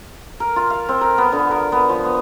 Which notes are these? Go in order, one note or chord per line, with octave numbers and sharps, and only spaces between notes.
A#4
F4
F5
C4
A#4
B3
D3
A#4
B3
F3
B3